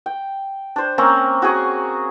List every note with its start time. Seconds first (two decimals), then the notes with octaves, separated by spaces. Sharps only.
0.06 G5
0.76 D4 C5
0.98 A#3 C4 C#4 A#5
1.42 F#4 G#4 G#5 A#5